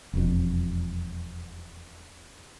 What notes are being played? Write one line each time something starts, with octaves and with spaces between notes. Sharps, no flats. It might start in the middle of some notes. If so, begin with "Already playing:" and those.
E1 F2